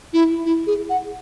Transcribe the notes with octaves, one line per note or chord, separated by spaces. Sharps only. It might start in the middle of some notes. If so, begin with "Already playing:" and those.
E4
E4
G#4
F#5